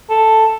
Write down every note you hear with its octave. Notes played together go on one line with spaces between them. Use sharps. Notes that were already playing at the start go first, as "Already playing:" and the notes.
A4